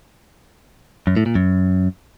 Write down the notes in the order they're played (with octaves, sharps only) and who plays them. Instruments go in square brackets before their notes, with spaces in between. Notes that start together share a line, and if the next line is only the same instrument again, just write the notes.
[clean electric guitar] F#2
A2
A#2
F#2